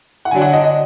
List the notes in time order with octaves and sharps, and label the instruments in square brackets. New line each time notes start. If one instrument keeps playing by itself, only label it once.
[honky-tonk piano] F#5
[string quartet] D3 F#3 D4 [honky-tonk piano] G#5
[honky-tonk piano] F#5
D#5
D#5